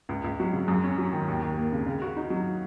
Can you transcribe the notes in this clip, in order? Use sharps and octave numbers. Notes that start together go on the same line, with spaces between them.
C#2
C#2
F#3
C#3
F#2
C#4
F#3
D#3
D#2
D#2
A#3
C#3
C#3
F#4
D#4
F#3